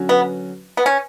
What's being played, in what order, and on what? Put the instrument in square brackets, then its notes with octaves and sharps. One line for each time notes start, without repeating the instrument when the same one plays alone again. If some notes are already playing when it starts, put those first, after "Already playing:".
Already playing: [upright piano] D3 F#3 C#4 F#4
[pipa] B3
B3
C#4